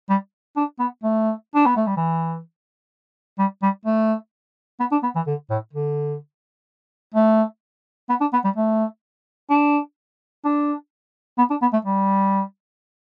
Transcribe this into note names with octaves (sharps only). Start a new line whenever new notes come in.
G3
D4
B3
A3
D4
B3
A3
G3
E3
G3
G3
A3
B3
D4
B3
E3
D3
A2
D3
A3
B3
D4
B3
G3
A3
D4
D4
B3
D4
B3
A3
G3